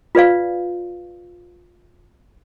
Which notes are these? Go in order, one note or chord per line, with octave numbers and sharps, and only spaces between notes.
F4 B4 D5 F5